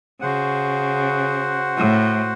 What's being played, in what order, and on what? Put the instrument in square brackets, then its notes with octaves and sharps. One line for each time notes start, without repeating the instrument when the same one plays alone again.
[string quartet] C#3 [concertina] F#4 C5 F#5
[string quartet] A2